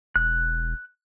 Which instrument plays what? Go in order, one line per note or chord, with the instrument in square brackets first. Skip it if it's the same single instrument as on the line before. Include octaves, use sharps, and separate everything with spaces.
[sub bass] E1 [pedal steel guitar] F#6